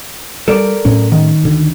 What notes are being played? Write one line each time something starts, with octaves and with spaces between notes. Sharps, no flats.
G3 A4 A#4 D5
A2 F#3 C#4
D#3
D2 D3